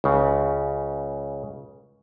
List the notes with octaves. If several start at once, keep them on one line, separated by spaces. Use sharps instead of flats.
C#2 C#3